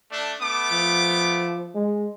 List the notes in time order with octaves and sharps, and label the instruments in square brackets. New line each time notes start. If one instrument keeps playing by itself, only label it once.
[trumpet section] A3 D4
A3 B3 D6
[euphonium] F3
G#3